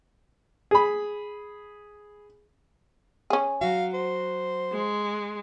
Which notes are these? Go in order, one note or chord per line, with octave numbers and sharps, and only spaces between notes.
G#4 B5
C#4 G#4
F#3 F#4 F5
C5
G#3